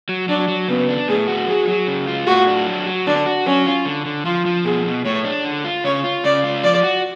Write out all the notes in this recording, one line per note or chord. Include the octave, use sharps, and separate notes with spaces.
F#3
F#3 D4
F#3
C#3 B3
D4
A2 G#4
F#4
F#3 G#4
F#3
C#3
F4
A2 F#4
D4
F#3
F#3
D3 D4
F#4
F#3 C#4
F4
D3
D3
F3 F4
F3
B2 G#4
B2
A2 C#5
D4
D3
F4
C#3 C#5
F4
C#3 D5
F4
F3 D5
F#4